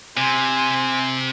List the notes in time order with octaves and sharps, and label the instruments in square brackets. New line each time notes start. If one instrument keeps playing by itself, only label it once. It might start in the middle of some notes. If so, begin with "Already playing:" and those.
[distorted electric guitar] C3 [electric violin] C5 G#5